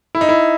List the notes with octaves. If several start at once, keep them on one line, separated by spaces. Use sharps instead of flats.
E4
D#4
E4